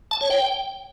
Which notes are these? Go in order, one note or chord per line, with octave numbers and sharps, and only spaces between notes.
A5
C#5
G5